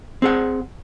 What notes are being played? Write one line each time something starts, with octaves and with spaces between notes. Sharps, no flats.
C4 G#4 F#5